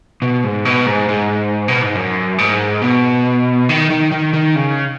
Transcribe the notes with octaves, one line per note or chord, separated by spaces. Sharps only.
B2
G#2
B2
G#2
G#2
B2
G#2
F#2
G#2
B2
D#3
D#3
D#3
D#3
C#3